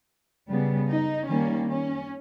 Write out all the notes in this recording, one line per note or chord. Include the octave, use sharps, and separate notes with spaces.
C#3 G3 B3
D#4
D#3 G3 A#3 C#4
C#4